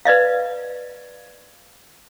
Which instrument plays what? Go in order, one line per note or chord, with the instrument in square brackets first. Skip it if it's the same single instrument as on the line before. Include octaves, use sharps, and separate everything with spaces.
[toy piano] B4 D5 D#5 F5